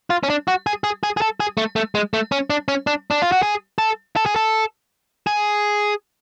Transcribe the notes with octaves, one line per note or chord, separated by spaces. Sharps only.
F4
C#4
D4
F#4
G#4
G#4
G#4
G#4
A4
G#4
A3
A3
G#3
A3
C#4
D4
C#4
D4
D4
F4
F#4
G#4
A4
A4
G#4
A4
G#4